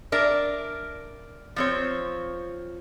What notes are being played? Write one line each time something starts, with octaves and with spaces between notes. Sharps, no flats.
D4 A#4 E5
F3 C4 C#5